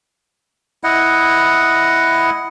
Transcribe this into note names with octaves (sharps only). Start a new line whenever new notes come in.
E4 D#5 F#5